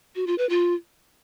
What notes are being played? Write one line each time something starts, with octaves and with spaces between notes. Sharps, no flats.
F#4
F4
B4
F4